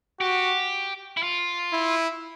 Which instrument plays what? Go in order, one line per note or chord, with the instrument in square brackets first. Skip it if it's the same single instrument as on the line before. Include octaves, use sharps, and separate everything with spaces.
[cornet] F#4 [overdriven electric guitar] G4
[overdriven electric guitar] E4
F4
[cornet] E4